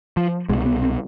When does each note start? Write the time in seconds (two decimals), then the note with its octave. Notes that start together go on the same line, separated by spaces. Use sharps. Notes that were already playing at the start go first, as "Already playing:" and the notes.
0.17 F3
0.49 C2 B2 G#3
0.66 B3
0.82 C4